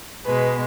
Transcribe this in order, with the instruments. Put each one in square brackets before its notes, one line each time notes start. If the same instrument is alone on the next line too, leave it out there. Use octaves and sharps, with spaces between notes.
[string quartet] B2 G#3 B4